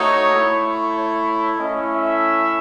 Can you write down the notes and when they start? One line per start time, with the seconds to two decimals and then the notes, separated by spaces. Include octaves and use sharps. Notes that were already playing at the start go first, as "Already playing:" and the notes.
Already playing: A3 D#4 F#4 C#5
0.34 A3 E4
0.95 C#5
1.57 A3 C#4 E4 D#5
1.87 E5